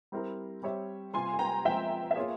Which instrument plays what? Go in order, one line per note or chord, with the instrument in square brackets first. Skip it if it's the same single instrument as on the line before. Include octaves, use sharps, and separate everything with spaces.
[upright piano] G3 C4 E4 A#4
G3 C4 G4 C#5 E5
[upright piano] C3 G3 C4 F4 [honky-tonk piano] G#5 C6
[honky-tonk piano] G#5
G5 A#5
[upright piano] F3 G#3 C4 F4 C5 [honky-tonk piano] E5 G5
[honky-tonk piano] E5
[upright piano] A#3 F4 G#4 [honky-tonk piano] C#5 F5